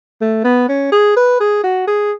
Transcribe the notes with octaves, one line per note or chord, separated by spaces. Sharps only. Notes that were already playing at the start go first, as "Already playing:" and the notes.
A3
B3
C#4
G#4
B4
G#4
F#4
G#4